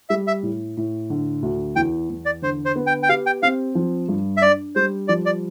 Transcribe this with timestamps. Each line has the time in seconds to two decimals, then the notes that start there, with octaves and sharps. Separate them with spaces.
0.10 G3 E5
0.27 E5
0.43 A2
0.77 A2
1.10 D3
1.42 D2
1.76 E2 G5
2.10 E2
2.26 D5
2.42 D3 C5
2.65 C5
2.76 B3
2.87 G5
3.03 G5
3.09 G4 F5
3.26 G5
3.43 C4 F5
3.75 F3
4.08 G2
4.37 E5
4.42 D4 D5
4.76 G3 C5
5.08 F3 D5
5.26 D5